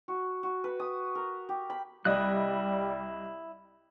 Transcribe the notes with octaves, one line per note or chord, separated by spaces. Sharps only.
F#4
F#4
B4
D#6
A#4
G4
B5
C2 G3 E4 D5 D#5 D#6 F#6